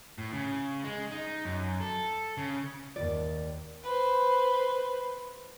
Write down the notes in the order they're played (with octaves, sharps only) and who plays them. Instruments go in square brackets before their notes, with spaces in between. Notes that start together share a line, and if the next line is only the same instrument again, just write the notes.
[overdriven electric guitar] A2
C#3
G#3
D#4
F#2
A4
C#3
[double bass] D#2 [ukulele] D5
[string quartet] B4 C5